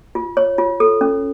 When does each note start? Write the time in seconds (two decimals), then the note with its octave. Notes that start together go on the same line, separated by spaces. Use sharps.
0.15 F4
0.37 C#5
0.58 F4
0.80 A4
1.01 C#4